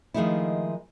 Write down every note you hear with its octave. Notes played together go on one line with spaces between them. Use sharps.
D#3 F3 G#3 A3 D#4 E4